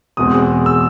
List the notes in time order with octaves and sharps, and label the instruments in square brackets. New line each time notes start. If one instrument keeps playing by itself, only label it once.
[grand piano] E2 B2 G#3 C4 D#6
E6